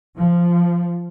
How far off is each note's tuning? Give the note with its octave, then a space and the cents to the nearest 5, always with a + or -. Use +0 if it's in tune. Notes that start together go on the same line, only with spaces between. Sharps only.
F3 -10